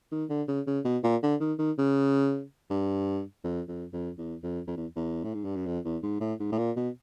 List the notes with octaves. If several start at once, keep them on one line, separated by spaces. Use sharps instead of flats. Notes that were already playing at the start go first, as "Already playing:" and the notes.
D#3
D3
C#3
C#3
B2
A#2
D3
D#3
D#3
C#3
G2
F2
F2
F2
E2
F2
F2
E2
E2
A2
G#2
G2
F#2
F2
E2
G#2
A2
G#2
A2
A#2
B2